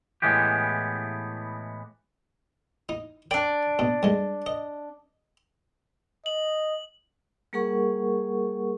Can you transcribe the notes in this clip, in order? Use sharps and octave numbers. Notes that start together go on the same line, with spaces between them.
A2 E3 G#3 B3 G4
D#4
D4 D5 G5
B2
G2 G#3
D#5
D#5 F#7
G3 A#3 G#4 A#4 F#5 C#6